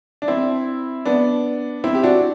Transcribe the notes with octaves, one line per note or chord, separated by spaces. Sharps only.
D4
C4 E4
B3 D4
C4 E4
G4
D4 F#4